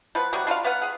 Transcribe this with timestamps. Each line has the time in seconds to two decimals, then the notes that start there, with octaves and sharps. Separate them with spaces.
0.15 F3 B3 B4
0.33 C3 F#3 G3 F#4
0.47 D4 F4 F#4 F5
0.64 B3 B4 F5 F#5
0.82 G#4 F#5